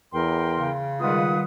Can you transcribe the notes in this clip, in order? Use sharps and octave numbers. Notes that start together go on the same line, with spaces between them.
E2 A#4 G5 C6
C#3
D#3 G3 G#3 F4 B4 F#5 D#6